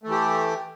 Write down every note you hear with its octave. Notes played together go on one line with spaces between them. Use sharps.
E3 A3 G4